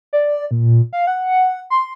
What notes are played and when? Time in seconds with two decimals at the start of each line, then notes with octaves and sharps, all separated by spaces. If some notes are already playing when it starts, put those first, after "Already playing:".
0.13 D5
0.51 A#2
0.93 F5
1.07 F#5
1.70 C6